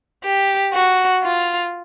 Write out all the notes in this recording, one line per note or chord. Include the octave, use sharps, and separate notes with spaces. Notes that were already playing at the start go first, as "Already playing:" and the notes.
G4
F#4
F4